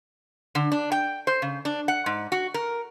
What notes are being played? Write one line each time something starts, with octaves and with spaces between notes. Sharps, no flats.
D3
D4
G5
C5
C#3
D4
F#5
G#2
F#4
A#4